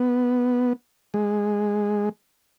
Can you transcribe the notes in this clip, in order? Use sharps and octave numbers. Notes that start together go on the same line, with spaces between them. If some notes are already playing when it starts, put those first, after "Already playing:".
Already playing: B3
G#3